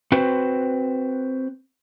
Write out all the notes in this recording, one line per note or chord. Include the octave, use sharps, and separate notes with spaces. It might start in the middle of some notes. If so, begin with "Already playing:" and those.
C4 F#4 B4 C5